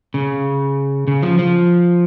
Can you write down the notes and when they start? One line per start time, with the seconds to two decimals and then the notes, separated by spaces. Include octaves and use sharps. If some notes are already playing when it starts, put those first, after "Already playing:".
0.14 C#3
1.08 C#3
1.23 F3
1.39 F3